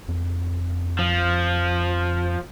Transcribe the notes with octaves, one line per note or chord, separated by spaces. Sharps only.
F2
F3